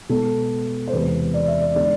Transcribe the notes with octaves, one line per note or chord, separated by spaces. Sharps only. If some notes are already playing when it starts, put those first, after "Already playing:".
B2 G#3 B3 A4
C5
E2 C3 G#3 B3 B4
D5
E5
D5
D3 G#3 B3 D5